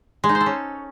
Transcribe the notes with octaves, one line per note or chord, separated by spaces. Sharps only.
G#3
D#4
C5
A4
C#4